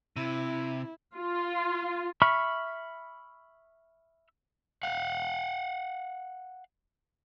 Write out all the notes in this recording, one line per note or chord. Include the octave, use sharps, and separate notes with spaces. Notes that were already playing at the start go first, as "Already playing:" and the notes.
C3 E4
F4
E5 B5 C#6 F6
F5 F#5